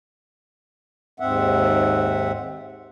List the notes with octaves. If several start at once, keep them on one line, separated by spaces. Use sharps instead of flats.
D#2 G#2 C4 E5 F#5